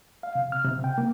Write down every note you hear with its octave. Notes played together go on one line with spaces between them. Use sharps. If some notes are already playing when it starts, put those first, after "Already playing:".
F5
C3
F6
C3
G5
A#3